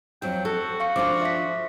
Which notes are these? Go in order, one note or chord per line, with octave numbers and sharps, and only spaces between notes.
F2 F#3 G5
F#4 A4
F5 C#6 C#7
F3 D4 F4 D6
E5 B6